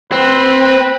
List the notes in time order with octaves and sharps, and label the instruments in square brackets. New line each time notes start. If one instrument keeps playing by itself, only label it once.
[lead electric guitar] C4 [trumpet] B4